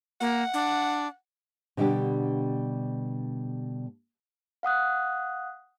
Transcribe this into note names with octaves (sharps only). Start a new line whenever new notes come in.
A#3 F#5
D4
B2 D3 G3 B3 D4 G4
F5 F#5 D#6 F#6